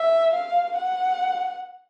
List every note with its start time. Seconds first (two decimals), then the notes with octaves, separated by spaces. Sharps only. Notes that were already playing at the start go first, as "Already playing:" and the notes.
Already playing: E5
0.34 F5
0.77 F#5